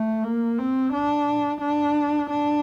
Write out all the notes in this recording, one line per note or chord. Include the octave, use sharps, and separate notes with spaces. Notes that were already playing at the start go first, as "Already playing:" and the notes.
Already playing: A3
A#3
C4
D4
D4
D4